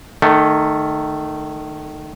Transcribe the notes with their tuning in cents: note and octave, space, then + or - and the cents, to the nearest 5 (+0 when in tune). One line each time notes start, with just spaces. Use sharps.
D#3 -20 A3 +0